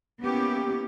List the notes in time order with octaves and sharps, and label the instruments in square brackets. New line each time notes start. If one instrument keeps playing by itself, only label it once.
[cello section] A#3 B3 C#4 E4 G4